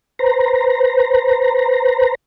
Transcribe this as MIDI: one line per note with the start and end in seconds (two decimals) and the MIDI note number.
0.19 2.15 71
0.19 2.15 72
0.19 2.15 82